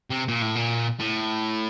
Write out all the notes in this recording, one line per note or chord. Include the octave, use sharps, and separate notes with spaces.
C3
A#2
A2
A#2
A2